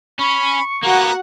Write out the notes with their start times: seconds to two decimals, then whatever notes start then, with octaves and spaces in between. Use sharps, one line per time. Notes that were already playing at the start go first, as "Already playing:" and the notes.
0.19 C#4 B5 C#6
0.83 A#3 B3 F#4 F#5 A#5